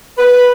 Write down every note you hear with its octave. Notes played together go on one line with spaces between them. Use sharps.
B4